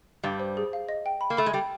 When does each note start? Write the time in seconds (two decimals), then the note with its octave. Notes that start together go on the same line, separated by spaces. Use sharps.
0.23 G2 G3 F5
0.40 C5
0.57 G#4
0.73 F5
0.89 D#5
1.06 G5
1.21 B5
1.30 A#3
1.37 A3 B5
1.46 G#3
1.53 G3 G5